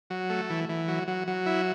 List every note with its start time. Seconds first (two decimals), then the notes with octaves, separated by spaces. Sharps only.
0.10 F#3
0.30 A3
0.50 E3
0.69 E3
0.88 F#3
1.08 F#3
1.27 F#3
1.46 E4